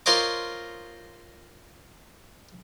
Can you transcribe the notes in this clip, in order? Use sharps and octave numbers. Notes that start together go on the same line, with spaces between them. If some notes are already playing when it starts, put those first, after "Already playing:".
F4 A#4 C5 C#5 D#5 D6